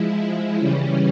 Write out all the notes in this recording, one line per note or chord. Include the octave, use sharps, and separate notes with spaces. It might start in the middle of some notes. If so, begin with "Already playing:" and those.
Already playing: F3 G#3 E4
C#3 E3 G3 C#4